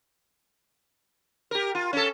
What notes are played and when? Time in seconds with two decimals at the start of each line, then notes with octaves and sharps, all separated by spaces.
1.51 G4 A#4
1.75 F4
1.93 C#4 A4